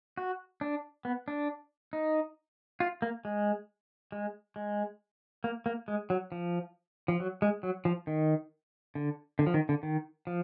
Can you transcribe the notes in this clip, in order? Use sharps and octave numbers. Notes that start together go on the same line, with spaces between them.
F#4
D4
B3
D4
D#4
F4
A#3
G#3
G#3
G#3
A#3
A#3
G#3
F#3
F3
F3
F#3
G#3
F#3
F3
D#3
D3
D3
F3
D#3
D3
D#3
F3